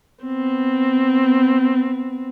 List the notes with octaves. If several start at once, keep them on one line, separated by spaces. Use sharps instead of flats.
B3 C4